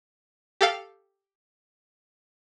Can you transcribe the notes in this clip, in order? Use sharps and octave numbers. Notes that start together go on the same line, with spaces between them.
G4 A4 F5